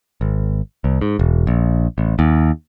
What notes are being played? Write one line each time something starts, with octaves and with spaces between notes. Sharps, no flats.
G#1
C2
G#2
E1
A#1
A1
D#2